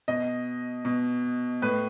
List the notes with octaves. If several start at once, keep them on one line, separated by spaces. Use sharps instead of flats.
B2 D#5
B2
A2 B4